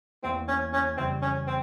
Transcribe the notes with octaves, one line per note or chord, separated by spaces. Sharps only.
E2 E3 A#3 C4 E4
C#4
C#4
F2 C#3 E3 G3 C4
C#4
C4